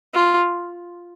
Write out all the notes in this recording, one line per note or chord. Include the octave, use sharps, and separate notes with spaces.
F4